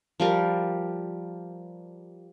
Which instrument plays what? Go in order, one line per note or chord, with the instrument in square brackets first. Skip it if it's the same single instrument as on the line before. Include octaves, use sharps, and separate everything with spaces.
[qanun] F3 G3 A#4